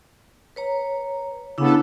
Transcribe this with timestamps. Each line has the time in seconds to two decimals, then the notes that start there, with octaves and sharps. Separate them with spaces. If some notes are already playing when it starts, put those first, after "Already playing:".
0.56 B4 C#5 A#5
1.58 C#3 B3 C#4 D4 E4 A4